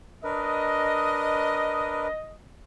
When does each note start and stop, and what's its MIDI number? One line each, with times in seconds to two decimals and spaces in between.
0.24 2.07 62
0.24 2.07 70
0.24 2.07 71
0.24 2.36 75